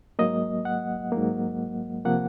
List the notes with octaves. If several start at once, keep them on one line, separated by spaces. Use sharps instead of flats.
G#2 F#3 A#3 D#5
F#5
G#2 F#3 A#3
C3 F3 A#3 F#5